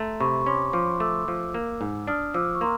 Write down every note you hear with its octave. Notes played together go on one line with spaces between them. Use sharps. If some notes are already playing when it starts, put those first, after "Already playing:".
Already playing: A3 A#5 C6
C3 B5 C#6
C#6
C#4 C6 D6
F3 C6 D6
A3 D6 E6
F3
A#3
G#2
D4 D#6 F6
F3 D6 E6
C#6
A#3 A#5 C6